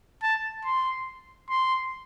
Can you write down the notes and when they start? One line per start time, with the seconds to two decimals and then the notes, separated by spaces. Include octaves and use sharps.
0.23 A5
0.65 C6
1.49 C6